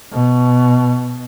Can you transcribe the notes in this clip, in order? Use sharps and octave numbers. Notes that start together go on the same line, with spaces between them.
B2